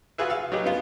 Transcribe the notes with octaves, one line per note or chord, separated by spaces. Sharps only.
F4 F#4 G#4 B4 E5
F5 E6
F#3 D#4 G4 G#4 B4
B3 F4 A#4